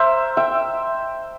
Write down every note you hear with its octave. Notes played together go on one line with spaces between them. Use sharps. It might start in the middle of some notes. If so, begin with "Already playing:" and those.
Already playing: A#4 C5 E5
E5 G5